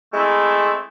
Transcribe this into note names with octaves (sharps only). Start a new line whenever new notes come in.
G#3 A3 C4 E4